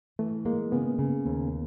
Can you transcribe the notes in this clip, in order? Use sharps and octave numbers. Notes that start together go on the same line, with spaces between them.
E3 A3
G#3 A#3
C#3 B3
C#3
D#2